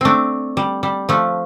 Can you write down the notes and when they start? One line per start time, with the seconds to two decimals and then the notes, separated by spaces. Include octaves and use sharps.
0.01 A3 C4 D4
0.57 G3
0.83 G3
1.09 F3 A3